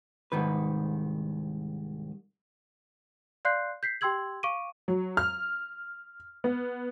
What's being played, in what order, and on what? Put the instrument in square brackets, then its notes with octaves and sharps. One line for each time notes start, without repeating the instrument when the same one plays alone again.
[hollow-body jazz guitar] C2 G#2 D#3 B4
[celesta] D5 F5 C6 F#6 G6 C7
G6 B6 C7
G4 G5 C6 E6 G#6 F#7
F5 C#6 D6 D7 D#7
[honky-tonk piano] F#3
F6
B3